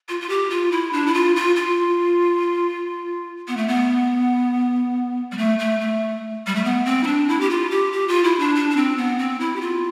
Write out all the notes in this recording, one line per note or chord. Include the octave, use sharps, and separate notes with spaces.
F4
F4
G4
F4
E4
D4
E4
F4
F4
F4
B3
A3
B3
G3
A3
A3
A3
G3
A3
B3
C4
E4
D4
E4
G4
F4
G4
G4
F4
E4
D4
D4
D4
C4
B3
C4
E4
G4
F4